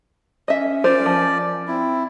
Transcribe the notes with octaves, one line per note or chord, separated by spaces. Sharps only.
C#4 D#5 E5
F4 A#4 C5 D5
F3
C4 E4